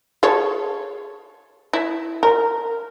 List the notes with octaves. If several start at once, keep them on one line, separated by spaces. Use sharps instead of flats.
G#4 A4 C#5
E4
A#4